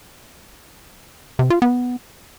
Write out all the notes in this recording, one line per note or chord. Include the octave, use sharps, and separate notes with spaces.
C3
F4
B3